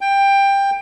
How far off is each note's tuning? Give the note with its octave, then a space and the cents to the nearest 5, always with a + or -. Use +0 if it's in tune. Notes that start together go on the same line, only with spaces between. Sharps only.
G5 +15